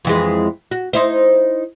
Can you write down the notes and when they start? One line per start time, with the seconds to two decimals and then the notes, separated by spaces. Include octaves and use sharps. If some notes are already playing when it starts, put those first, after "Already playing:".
0.05 F2 E3 G#3
0.71 F#4
0.93 D#4 E4 C5